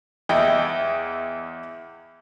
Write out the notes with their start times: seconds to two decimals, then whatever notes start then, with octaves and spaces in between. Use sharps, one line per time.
0.29 E2 E4 D#5 G5